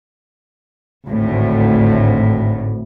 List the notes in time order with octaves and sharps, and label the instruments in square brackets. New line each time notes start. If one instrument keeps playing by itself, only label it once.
[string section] G#1 D2 A2